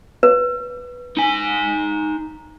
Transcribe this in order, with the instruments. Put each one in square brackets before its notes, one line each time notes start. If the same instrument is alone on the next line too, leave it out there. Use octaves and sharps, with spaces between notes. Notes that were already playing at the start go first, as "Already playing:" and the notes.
[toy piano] B4
[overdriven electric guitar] D#4 G#5